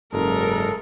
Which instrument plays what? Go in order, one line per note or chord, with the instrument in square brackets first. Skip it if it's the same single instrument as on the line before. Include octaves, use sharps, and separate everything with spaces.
[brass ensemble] F#1 [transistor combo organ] G#2 [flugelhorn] A4 [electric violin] A#4